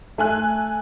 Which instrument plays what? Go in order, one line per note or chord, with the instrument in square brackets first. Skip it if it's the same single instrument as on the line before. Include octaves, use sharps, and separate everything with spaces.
[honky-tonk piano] A3 G#5 F#6